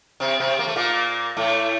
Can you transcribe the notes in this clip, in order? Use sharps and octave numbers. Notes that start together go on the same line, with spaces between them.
C3 C4
C3 C4
A#3
A3
A#2 A#3
A2 A3